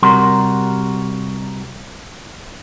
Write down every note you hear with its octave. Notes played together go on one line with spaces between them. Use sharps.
C3 G3 F#4 A#4 C6